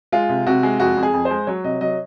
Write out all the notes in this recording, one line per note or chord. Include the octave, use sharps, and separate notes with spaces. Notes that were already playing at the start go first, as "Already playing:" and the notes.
G#3 F4
C3
C3 F#4
G#3
F2 F#4
F2
G#4
F2
C5
G#3
F#3 C#5
C3 D#5
F#3 D#5